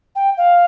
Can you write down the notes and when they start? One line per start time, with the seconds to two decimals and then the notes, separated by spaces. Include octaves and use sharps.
0.15 G5
0.37 F5